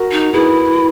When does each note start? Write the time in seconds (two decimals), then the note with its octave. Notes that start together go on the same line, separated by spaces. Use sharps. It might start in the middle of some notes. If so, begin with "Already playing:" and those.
Already playing: F#4 A#4
0.11 D#4
0.33 E4 G#4 B4